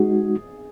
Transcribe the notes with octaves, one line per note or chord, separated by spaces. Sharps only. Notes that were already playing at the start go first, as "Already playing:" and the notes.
Already playing: G#3 D#4 F#4 G#4